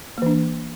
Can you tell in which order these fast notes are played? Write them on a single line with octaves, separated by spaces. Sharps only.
A#3 E3 D4